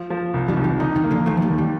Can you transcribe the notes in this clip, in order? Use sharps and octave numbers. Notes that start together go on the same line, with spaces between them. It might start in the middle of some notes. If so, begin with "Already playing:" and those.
Already playing: F3
F3
C2
D#3 G3
C2
D#3 G3
D3 D#4
D#3
A#3
D3 F3
D#2 F3 A3
F3
D#3 G3
D#2
D#3 G3